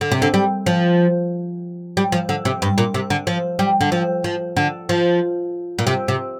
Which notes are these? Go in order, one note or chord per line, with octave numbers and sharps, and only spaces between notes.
D3
C3
D3
G3
F3
G3
F3
D3
C3
G2
A#2
C3
D3
F3
G3
D3
F3
F3
D3
F3
A#2
C3
C3